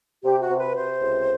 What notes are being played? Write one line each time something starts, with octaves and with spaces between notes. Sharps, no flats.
C3 G4
F#4
C3
B4
C3 C5
C#2